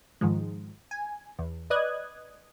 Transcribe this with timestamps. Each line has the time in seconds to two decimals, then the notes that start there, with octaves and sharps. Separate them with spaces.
0.21 G#2 D#3 F3 G#3
0.91 G#5
1.39 E2
1.70 B4 D5 D#5 D#6 F#6 G#6